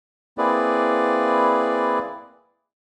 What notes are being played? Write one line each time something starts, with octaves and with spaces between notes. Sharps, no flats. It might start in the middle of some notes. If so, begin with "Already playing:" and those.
A#3 C4 E4 G#4 B4 D5